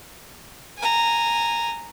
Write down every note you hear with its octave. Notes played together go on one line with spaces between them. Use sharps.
G#5 A#5